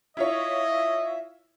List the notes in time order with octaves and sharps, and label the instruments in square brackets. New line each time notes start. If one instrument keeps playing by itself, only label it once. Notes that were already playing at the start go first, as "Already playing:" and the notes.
[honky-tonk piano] E4 F4 C#5 [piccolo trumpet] D#5 [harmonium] E5